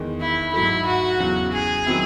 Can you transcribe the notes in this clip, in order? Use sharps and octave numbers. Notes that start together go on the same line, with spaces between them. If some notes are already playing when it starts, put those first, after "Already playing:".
Already playing: E2 D#3 G#3
E4
G#2 F#3 A3 E4
F#4
E2 C#3 F#3
G#4
D#3 F#3 C4 E4